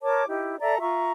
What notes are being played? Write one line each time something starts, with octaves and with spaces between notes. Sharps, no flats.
A#4 C#5 A5 D6
D#4 E4 G4
A4 D5 E5 A#5
F4 E5 A#5 C#6